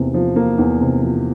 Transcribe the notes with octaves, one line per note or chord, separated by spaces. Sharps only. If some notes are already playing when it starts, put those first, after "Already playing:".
Already playing: E2 C3 A#3
F3
A#3
E2
C3
F3